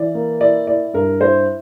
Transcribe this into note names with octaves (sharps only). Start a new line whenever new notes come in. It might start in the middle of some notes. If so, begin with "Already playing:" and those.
Already playing: E3 D5
A#3
E4 D5
E4 D5
G2 A#4
E4 C5